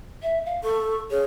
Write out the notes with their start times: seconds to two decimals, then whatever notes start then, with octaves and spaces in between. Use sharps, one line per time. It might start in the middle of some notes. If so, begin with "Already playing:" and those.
0.23 E5
0.46 F5
0.64 A4 C#6
1.11 G#4 C#5